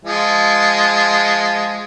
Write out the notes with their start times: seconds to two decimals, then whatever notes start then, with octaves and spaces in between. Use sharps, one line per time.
0.05 F3 G#3